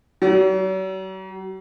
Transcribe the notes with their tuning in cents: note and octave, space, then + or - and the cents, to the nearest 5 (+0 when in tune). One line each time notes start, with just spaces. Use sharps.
F#3 +45